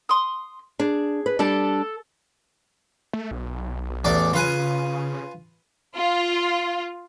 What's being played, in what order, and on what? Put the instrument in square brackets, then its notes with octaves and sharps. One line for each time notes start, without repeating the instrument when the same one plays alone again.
[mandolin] C6 D#6
[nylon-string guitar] D4 [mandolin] G#4
[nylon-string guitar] B4
[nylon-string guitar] G3 D4 D5 [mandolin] A4 A5
[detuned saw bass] A3
B1
[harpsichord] A1 E2 D5
[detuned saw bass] C#3 [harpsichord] F4 B4 G#5
[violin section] F4